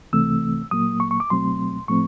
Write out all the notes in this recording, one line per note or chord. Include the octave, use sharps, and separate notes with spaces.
C#2 C3 E3 A3 C4 E6
A#2 F#3 A#3 D#6
C#6
C#6
D6
C#2 B2 F#3 A3 C4 C6
A2 F3 A3 C4 C#6